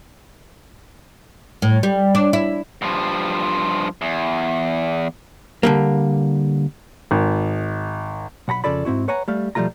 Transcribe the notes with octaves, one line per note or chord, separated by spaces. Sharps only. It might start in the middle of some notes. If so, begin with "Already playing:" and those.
A2
G3
D4
E4
G2 F3
E2
D3 G3 A#3
G#1
B1 F#5 A#5 B5
F2 C#3 F4 A4 D5 B5
G#2 C4 E4 F#4
B4 C#5 F#5 G#5 A#5
G3 A3 F5
B2 F3 G3 A3 F4 A#5